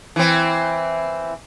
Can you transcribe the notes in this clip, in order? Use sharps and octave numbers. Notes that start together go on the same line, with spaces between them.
E3 C4